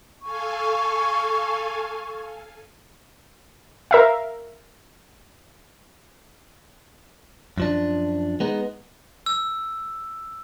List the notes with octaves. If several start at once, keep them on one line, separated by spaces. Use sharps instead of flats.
A4 F5 G#5 C#6
A#4 E5 F5
F#2 F3 D4
G#3 B3 D#4
E6